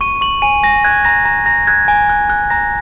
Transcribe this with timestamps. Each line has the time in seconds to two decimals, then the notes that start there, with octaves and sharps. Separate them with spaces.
0.01 C#6 D#7
0.21 C#6 F#7
0.42 G#5 D#7
0.63 G#5 A#6
0.84 F#6 G#6
1.05 A#5 A#6
1.25 A#5 A#6
1.46 A#5 A#6
1.67 F#6 G#6
1.88 G#5
2.09 F#6
2.30 F#6
2.50 A#5 A#6